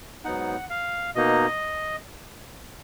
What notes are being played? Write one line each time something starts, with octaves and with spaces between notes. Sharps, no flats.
G#2 F#3 B3 D#4 F#5
F5
B2 A#3 D#4 D#5